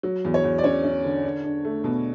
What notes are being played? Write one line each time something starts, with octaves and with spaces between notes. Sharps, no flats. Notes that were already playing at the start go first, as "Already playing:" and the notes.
F#3
E2
C#5
E2
D5
C#4 C#5
C#4
D3
D4
D4
A3
B2